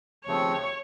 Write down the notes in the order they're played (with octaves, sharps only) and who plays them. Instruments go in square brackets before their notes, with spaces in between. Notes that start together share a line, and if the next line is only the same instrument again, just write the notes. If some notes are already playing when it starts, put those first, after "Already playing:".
[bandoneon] D#2 C#3 F3 A3 C4 [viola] C#5